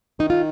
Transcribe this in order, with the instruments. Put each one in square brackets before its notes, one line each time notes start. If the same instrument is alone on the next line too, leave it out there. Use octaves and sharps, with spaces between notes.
[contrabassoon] D#3 [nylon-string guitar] D#4
[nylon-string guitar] F4